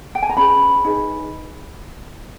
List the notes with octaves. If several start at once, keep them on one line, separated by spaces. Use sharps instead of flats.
G5
G#5
A#5
C#4 G#4 B4 B5
D#4 G#4 B4